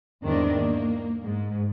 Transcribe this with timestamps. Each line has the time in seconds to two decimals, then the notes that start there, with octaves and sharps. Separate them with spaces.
0.22 E2 G#2 D#3 G3 C4 D4
0.56 A#3
1.23 G#2